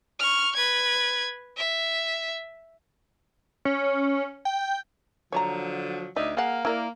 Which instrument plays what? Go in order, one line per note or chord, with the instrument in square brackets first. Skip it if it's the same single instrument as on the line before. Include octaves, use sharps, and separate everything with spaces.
[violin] C#6 F6
B4 G#6
E5
[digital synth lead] C#4
G5
[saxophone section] D3 F3 F#3 [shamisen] C#5 D5 A#5
[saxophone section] D2 D#4 E5 [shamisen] D5
[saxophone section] A#3 F5 [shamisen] G#4 F#5
[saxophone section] A#3 [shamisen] E4 A#4 D5